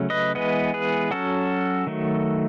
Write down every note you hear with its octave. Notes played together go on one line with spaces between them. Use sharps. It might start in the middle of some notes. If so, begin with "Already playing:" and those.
Already playing: C#3 F#3 A3 C#4
B4 D#5
E3 G#3 B3 B4 D#5
G#4 B4
F#3 C#4 F#4 A4
D#3 F#3 A3